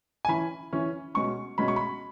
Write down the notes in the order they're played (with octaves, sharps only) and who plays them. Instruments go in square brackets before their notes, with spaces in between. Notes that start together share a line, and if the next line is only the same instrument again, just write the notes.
[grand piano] G#5
E3 C#4 B5
E3 C#4
B2 G#3 C#4 C#6
B2 G#3 C#4 B5
C#6
B5